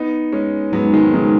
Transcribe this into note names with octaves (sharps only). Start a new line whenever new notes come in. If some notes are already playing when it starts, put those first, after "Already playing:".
Already playing: B3 D#4
G#3 C#4
G#2 F#3 B3
D#3 G#3
C#3 F#3